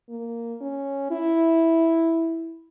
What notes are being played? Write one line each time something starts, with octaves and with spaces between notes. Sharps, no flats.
A#3
C#4
E4